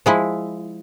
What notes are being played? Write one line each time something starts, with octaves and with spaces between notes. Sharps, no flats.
F3 G#3 E4